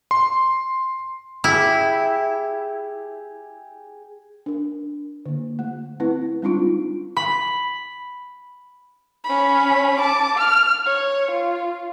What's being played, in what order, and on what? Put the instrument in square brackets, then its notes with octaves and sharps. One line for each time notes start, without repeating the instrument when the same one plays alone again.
[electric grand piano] C6
[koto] E4 [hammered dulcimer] G4 G#4
[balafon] D4 A#4
D3 A#3
A3
A3 C4 E4 B4
G3 G#3 C4 D4 D#4 F4
[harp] B5
[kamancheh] C#4 B5
A5 D6
F6
C#5
F4